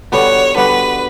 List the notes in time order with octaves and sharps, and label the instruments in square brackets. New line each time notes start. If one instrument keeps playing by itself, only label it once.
[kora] D3 G3 B3 F#4 [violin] C#5
[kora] D3 G3 B3 F#4 [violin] B4